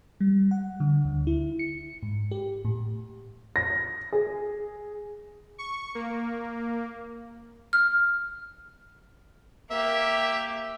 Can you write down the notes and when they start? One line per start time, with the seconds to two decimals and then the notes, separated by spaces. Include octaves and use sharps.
0.20 G3
0.51 F#5
0.80 D3
1.05 D2
1.27 E4
1.59 C#7
2.03 G#2
2.31 G4
2.65 A2
3.56 A#6
4.12 G#4
5.58 C#6
5.95 A#3
7.73 F6
9.71 A#3 G4 E5